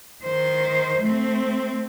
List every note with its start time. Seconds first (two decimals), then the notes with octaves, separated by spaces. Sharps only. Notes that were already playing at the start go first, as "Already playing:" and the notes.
0.23 D#3 C5
1.01 A3 C4